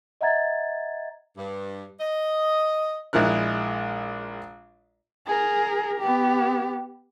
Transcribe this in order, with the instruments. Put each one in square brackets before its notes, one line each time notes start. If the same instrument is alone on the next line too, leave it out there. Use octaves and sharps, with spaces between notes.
[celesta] D#5 E5 F#5 A#5 G#6 A6
[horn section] G2
D#5
[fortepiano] A#1 G#3 E4 A#4 F#6
[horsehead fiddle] G#4 A#4
B3 G4